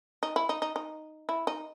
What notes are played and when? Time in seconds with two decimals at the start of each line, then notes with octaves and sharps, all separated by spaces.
0.23 D#4
0.36 E4
0.49 D#4
0.62 D#4
0.76 D#4
1.29 E4
1.47 D#4